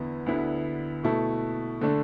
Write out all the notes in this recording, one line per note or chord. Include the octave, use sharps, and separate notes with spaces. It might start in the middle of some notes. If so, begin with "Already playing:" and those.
Already playing: E2 D3 B3 E4
D2 D3 B3 E4
B2 A3 E4 A4
D3 A3 D4